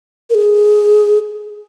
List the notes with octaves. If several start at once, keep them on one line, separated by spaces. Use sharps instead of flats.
A#4
G#4